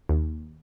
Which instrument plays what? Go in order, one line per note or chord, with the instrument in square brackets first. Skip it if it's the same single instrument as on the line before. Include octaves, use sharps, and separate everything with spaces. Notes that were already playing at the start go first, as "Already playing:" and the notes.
[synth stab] D#2